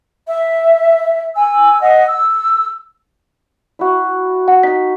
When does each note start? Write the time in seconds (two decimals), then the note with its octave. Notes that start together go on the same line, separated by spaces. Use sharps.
0.28 E5
1.36 G#5 E6
1.81 D#5 F#5
2.07 E6
3.79 E4 F#4
4.48 F#5
4.63 D#4 B6